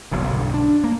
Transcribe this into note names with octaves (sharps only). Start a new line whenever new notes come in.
F#1 B1 G2 A#2
B1 G2 D3
D4
A#3